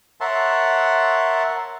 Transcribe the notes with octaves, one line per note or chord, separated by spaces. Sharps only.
A#4 C#5 E5 F#5 A5 C6